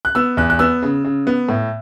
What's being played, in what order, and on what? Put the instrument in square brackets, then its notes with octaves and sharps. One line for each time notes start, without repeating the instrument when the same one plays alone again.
[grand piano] F#6
B3 E6
E2 F#6
F#6
B3 E6
C#3
C#3
B3
A2